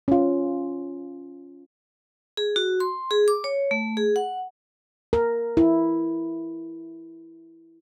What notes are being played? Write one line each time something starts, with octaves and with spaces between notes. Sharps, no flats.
C#4 F4
G#4
F#4
C6
G#4
D6
C#5
A3
G#4
F#5
A#4
E4